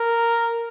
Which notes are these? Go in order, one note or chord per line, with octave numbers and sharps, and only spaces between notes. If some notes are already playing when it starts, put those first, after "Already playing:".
Already playing: A#4